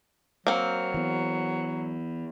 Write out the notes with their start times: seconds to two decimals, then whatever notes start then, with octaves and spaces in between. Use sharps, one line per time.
0.47 F#3 A#3 C4
0.94 E3 B3